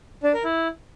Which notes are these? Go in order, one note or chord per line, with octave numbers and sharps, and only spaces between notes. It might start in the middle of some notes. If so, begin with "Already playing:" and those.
D4
A#4
E4